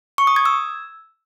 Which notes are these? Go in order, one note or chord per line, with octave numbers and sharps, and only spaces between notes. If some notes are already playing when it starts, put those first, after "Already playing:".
C#6
D#6
G#6
E6